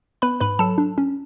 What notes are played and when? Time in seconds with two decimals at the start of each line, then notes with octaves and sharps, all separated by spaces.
0.22 B3 B4 B5
0.40 G#2 B4 B5
0.59 F#3 A4 A5
0.78 D4
0.98 C#4